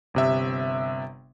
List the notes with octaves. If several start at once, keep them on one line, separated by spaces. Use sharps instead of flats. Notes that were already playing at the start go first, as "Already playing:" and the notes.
G1 C3 E5